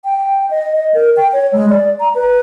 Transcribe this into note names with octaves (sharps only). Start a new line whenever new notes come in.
G5
D#5
D#5
A#4
G5
C#5
G#3
D5
A#5
B4